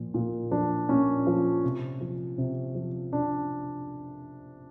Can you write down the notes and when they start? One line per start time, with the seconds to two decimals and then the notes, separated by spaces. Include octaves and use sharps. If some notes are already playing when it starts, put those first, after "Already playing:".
Already playing: A#2 F3
0.14 A#2
0.51 F3 D4
0.89 A#2 C#4
1.27 F3
1.64 C3
2.01 F3
2.38 C3
2.75 F3
3.12 C3 D4